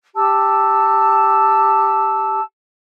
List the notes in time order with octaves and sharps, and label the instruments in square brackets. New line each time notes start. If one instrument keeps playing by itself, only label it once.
[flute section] G4 A5 E6